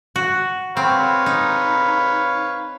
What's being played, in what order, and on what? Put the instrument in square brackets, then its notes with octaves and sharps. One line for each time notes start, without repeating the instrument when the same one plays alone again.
[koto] F#4
[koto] C4 [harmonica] B4 C#5 F5
[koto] D#4